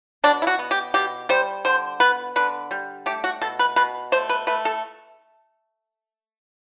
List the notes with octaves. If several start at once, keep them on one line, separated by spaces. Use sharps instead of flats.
B2 D4
E4
F#4
B3
G4
B2 G4
G3 C5
D3 C5
B3 B4
D3 B4
G3
A3 G4
F#4
B2 A4
B4
B2 B4
A3 C5
B4
A3 B4
A4